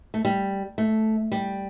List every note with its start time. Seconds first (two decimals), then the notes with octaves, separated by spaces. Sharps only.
0.14 A3
0.25 G3
0.78 A3
1.32 G3